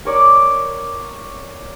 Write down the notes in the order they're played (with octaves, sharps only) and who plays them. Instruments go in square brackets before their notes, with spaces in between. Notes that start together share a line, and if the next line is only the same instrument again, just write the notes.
[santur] A#4 C#5 D5 D6